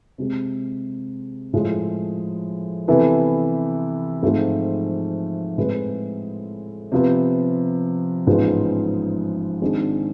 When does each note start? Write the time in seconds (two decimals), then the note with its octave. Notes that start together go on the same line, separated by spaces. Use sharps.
0.18 C3 G#3 C4
1.53 A2 F3 G#3
2.88 C3 E3 B3 E4 A4
4.23 G#2 F3 A3 C4 F4
5.58 A2 G#3 C4 E4 B4
6.92 C3 F3 B3
8.27 A1 G#2 F3 G#3 B3
9.62 G#1 G#2 G#3 D4